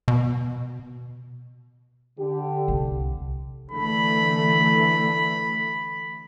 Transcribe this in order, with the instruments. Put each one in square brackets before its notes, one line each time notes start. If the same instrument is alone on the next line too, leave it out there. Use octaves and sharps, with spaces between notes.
[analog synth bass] B2
[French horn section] D3 G4
[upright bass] C2
[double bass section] D3 E3 A3 [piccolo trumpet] B5